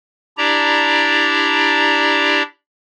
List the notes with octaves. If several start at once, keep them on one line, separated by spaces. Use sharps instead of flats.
D4 E4 G4 D5 A#5